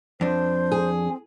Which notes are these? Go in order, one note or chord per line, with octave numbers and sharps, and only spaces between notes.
F2 D4 C5
G#4
C4